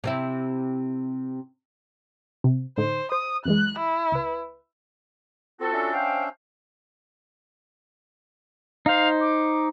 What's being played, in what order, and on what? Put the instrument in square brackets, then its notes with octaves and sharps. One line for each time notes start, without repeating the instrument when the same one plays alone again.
[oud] C3 C4 E4
[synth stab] C3
[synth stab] A2 D3 D#4 [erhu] C5
[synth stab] C5 [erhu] D#6
[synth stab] F#2 E3 G#3 [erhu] F#6
[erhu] E4
[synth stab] C#2 B4
[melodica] C4 [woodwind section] F4 F#4 A4
[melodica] C#4 D4 E5
[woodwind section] C5 F5 G5
[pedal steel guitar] D#4 C5 [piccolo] F5
[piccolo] D6